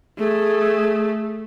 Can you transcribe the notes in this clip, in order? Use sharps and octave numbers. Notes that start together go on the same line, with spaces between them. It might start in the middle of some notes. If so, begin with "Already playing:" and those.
A3 G#4